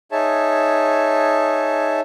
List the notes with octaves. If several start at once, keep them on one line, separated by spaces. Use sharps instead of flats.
D#4 G#4 C#5 E5 A5